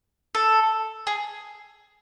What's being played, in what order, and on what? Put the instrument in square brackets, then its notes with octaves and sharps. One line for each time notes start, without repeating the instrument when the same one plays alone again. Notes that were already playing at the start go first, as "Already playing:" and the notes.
[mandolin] A4
G#4